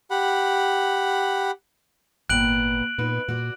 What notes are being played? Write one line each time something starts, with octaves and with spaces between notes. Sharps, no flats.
G4 F#5 B5
G#1 A#2 B3 G5 F#6 D7 F#7
A#2 B3 D#4 B4
A#2 F#4 D5